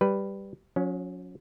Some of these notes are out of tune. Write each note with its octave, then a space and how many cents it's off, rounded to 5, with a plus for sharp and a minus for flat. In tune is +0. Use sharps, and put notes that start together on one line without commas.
G3 +0 B4 +0
F#3 -40 C#4 +10